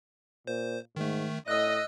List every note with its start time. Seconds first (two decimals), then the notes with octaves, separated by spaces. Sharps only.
0.47 A#2 C5
0.96 G#2 D#3 A3
1.48 A2 D#5 E6 F#6